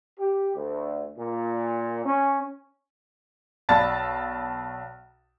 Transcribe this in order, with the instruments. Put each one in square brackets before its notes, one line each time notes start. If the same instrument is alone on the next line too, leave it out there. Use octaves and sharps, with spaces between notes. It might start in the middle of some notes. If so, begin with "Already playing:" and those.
[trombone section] G4
D2
A#2
C#4
[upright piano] B1 D5 F5 A5 B5 A6